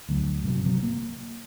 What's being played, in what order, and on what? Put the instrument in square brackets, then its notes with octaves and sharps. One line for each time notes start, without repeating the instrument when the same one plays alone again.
[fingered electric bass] D2 F#3
G2 C3 F#3
C3 F#3
A#3